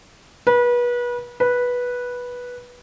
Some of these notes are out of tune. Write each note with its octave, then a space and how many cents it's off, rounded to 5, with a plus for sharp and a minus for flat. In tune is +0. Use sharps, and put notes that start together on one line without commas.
B4 -30
B4 -10